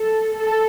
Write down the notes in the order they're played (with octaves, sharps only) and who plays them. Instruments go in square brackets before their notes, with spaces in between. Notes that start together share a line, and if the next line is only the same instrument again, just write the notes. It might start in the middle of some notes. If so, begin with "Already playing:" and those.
Already playing: [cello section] A4
A4